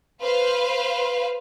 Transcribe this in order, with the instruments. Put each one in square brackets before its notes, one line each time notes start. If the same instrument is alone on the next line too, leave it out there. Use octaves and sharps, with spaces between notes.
[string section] B4 C5 F5